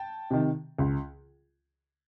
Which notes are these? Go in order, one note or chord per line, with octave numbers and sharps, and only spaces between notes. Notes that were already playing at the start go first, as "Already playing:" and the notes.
Already playing: G5 A5
C3 D#3
C#2